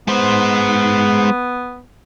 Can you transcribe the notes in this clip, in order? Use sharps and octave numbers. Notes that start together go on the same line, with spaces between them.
G#3 B3 C5